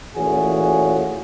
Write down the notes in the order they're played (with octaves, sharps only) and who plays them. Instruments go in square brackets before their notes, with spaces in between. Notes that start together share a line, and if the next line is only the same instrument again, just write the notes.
[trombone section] A#2 E3 A3 C#4 F#4 G#4